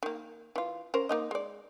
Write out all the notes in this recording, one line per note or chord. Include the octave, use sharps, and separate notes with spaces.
D#3 A#3
E3 F4
C#4 A#4 C5
A#3 D#4 D#5
G#3 D5